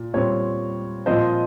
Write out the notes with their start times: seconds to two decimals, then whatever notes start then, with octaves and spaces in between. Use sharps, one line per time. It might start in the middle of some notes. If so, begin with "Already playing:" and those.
Already playing: A#2
0.14 A#2 G3 C4 C#5
1.06 A#2 F3 C4 C5 D#5